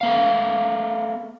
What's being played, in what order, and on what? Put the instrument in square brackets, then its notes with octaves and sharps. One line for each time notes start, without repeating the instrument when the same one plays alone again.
[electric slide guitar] A3 B3 F5